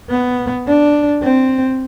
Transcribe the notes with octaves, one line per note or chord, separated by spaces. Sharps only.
B3
D4
C4